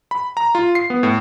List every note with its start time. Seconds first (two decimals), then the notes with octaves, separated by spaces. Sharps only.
0.11 B5
0.37 A#5
0.55 F4
0.75 C7
0.90 B3
1.03 A2